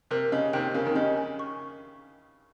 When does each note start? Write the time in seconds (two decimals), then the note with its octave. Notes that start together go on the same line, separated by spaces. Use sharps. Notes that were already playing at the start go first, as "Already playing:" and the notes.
0.11 C3 A#4
0.32 C#3 D#5
0.53 C3 D#3 G5
0.74 C#3 A#4
0.85 D#3
0.95 C#3 D#5
1.17 G#5
1.39 C#6